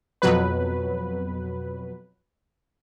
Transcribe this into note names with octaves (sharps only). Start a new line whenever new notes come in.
F2 B2 F#3 B4